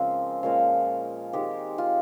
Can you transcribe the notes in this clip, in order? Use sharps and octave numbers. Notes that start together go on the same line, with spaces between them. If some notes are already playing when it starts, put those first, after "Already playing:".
Already playing: C#3 F3 G#3 A#3 C4 A#4
A#2 F3 G#3 C#4 F5
D#3 G#3 C4 G4
F4